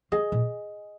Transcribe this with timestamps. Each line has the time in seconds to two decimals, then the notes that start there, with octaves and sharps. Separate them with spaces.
0.12 A#3 G#4 D#5 G#5
0.32 A#2